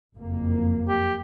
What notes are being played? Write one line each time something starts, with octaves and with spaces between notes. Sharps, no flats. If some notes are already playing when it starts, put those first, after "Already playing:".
F#1 F2 A#3
G4